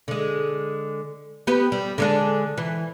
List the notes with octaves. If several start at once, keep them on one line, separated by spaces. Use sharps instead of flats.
D3 G#3
B3 G4 B4
G3
D3 G#3 D4
E3